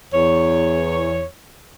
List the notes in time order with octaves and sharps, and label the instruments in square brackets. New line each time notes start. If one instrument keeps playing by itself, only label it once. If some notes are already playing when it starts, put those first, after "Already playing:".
[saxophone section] E2 C#5